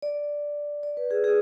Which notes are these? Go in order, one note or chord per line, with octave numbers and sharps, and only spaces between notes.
D5
D5
B4
G#4
G#4